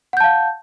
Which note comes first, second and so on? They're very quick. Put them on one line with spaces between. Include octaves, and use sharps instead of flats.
F#5 G6 A5 F5